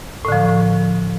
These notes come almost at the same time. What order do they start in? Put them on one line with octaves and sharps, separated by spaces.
A2 D3 F3